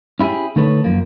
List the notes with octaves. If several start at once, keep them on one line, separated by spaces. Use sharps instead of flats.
C#4 E4 F4 G4 G#4
D3 A3 D#4 A4 B4 C#5
F#2 F3 A#3